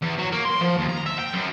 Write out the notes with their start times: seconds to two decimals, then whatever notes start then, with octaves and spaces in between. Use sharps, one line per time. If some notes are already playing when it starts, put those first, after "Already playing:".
0.02 E2
0.19 F#3
0.32 A#3
0.45 C6
0.61 F3
0.77 D#2
0.89 A#5
1.06 E5
1.19 G5
1.33 F#2